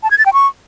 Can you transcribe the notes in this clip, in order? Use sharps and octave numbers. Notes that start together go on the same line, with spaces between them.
A5
G#6
A6
G5
C#6